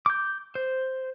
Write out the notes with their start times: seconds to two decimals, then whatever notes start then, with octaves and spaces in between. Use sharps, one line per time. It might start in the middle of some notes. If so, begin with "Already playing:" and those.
0.06 D6 G6
0.55 C5